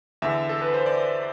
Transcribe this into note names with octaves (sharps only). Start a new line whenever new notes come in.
E2 D3 E5
A4
B4
C5
D5